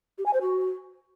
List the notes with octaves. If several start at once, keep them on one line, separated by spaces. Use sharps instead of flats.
G4
G#5
C5
F#4